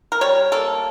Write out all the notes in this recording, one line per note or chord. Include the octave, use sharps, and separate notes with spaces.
A#4
G3 C#5
A#3 A4